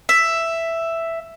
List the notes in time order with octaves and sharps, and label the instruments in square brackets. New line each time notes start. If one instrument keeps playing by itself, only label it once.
[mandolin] E5